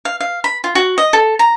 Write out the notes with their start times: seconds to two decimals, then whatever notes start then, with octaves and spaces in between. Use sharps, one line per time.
0.05 F5
0.20 F5
0.44 B5
0.64 F4
0.75 F#4
0.98 D#5
1.13 A4
1.39 A#5